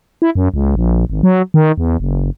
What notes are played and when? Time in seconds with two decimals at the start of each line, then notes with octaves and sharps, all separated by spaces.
0.22 E4
0.35 F#2
0.54 C#2
0.76 A#1
1.10 G#1
1.23 F#3
1.54 D#3
1.78 E2
2.00 F#1